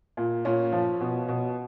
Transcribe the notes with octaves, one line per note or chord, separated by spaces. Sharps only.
A#2
A#2 C#4
F3
B2
B2